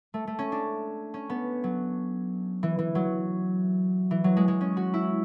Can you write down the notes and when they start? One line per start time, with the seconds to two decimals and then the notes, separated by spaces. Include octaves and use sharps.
0.14 A3
0.27 A3
0.39 C#4
0.52 D4
1.14 C#4
1.30 B3
1.64 F#3
2.63 E3
2.79 E3
2.95 F#3
4.11 E3
4.24 F#3
4.37 G#3
4.48 G#3
4.61 C#4
4.77 F#4
4.94 E4